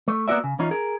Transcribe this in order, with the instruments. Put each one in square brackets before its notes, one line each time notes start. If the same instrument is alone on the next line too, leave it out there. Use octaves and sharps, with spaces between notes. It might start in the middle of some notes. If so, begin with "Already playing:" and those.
[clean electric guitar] A3
A#3 B3 E4 F#4 D5 E5
C#3
E3 C#4 D#4 F4
G#4 A#4